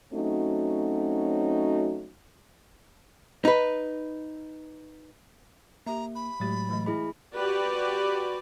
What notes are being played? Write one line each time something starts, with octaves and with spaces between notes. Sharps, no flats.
F#3 A3 C4 C#4 D#4 F#4
D#4 B4
A#3 G4 E5 A#5
B5
A2 F#3 G#3 A3 G4 A6
E3 A3 D#5
E4 G#4 D#5 B5
F#4 G4 B4 D5